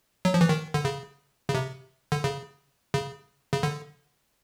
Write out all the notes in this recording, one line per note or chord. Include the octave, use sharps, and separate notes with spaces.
F#3
F3
E3
D#3
D3
C#3
C#3
C3
D3
C#3
C#3
C#3
D3